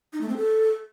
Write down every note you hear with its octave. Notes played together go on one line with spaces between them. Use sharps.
D#4
A3
C4
A4